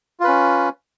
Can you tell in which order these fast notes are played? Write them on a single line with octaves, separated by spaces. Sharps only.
F4 B4 C#4